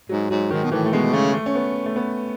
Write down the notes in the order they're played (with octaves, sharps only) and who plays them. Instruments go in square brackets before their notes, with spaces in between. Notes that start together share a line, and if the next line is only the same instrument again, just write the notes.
[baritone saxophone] G#2 [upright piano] F#3
[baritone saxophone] G#2 [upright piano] F#3
[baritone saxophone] G#2 [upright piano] D#3
[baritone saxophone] B2
[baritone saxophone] A2 [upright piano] E3
[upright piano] A3
[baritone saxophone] B2 [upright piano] G#3
[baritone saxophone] C#3 [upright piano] A3
[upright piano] A3
C#4
B3
A3
B3